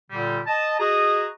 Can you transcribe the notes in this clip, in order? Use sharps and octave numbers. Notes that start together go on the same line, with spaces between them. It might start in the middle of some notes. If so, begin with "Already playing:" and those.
A#2 D3 G3
D#5 A5
F#4 G#4 D#5 A#5 D#6